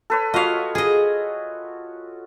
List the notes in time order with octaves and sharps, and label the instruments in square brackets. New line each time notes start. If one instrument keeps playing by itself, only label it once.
[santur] A4 B4 C#5
[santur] F4 F#4 C#5 [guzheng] D#5 F5
[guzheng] G#4 D#5